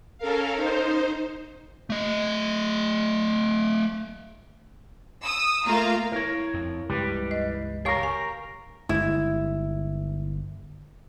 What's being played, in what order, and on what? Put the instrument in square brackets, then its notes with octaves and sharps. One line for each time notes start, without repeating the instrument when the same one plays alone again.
[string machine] C#4 A4 A#4 F5
D#4 C5
[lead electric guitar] A3 D#5
[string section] D#6 E6
A3 A#3 F4 A#4 F5 A#5
[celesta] E4 [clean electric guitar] A#4 C#5
[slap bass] F2
[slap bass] C#2 G2 [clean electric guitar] G3 G4 B4
[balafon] D#5
[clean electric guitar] G4 A#4 [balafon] C#5 F5 C#6 [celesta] C7
[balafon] G#5 [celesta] C#6
[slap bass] G1 G#3 [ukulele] E4